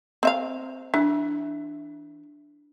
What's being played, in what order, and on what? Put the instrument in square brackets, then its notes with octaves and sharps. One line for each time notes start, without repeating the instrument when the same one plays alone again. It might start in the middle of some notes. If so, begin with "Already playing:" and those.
[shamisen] C4 E5 F5
[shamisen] E3 [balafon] D4